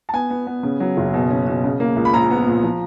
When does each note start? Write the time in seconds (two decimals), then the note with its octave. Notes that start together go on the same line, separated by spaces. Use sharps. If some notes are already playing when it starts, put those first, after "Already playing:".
0.09 A5
0.13 B3 G#5
0.30 B3
0.47 B3
0.63 C#3
0.80 F#3
0.97 F#1
1.14 B2
1.30 C#4
1.47 B2
1.64 C#3
1.80 A#3
1.96 C#2
2.05 B5
2.13 A#1 A#5
2.30 B3
2.47 A#2
2.64 F3